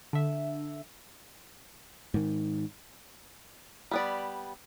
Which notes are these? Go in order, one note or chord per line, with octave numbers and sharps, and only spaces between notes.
D3 E5
G#2 D#3
G3 B3 D5